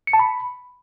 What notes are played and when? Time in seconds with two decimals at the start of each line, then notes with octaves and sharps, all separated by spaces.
0.07 C#7
0.13 A5
0.19 B5